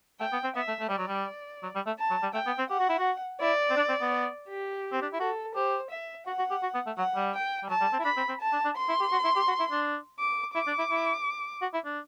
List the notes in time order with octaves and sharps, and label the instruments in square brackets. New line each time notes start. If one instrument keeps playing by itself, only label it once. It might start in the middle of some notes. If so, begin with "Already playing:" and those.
[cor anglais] A3 [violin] G5
[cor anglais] B3
C4
[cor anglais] B3 [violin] E5
[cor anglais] A3
A3
[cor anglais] G3 [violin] D5
[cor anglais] F#3
G3
F#3
G3
A3
[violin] A5
[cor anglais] F#3
G3
[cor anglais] A3 [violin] G5
[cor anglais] B3
C4
[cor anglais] G4 [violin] F#5
[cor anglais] F#4
E4
F#4
[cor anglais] E4 [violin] D5
[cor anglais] C4
D4
C4
B3
[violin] G4
[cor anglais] C4
D4
E4
[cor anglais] F#4 [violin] A4
[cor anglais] G4 [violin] C5
[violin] E5
[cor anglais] F#4 [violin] F#5
[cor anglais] F#4
G4
F#4
B3
A3
[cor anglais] F#3 [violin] F#5
[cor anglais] G3
[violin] G5
[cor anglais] G3
[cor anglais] F#3 [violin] A5
[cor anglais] G3
C4
E4
[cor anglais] D4 [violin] B5
[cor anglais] C4
C4
[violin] A5
[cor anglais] D4
D4
[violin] C6
[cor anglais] E4
G4
F#4
E4
G4
F#4
E4
D4
[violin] D6
[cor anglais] E4 [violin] D6
[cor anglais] D4
E4
E4
F#4
E4
D4